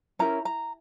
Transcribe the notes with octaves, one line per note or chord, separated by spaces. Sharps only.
C#4 E4 G4 A#4 A#5
A#5